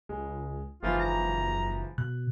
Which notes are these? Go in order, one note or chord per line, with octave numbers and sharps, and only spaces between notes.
C#2 G#3
F#1 G#2 E3 F3 F4
A#5
B2 F#6